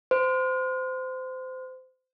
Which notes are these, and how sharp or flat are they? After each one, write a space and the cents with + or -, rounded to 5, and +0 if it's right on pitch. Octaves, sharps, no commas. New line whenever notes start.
C5 -25